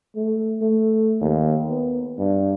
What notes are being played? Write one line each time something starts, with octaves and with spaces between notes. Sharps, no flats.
A3
A3
D#2
B3
G2